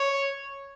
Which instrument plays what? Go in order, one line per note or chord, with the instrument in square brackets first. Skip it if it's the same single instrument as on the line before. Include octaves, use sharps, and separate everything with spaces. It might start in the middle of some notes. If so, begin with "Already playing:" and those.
Already playing: [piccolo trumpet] C#5